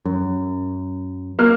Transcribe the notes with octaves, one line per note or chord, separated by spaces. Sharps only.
F#2
A#3 F6